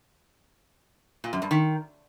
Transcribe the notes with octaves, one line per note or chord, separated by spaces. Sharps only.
A#2
F#2
G2
D#3